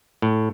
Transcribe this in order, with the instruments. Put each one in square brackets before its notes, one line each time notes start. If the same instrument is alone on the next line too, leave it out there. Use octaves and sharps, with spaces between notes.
[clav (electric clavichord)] A2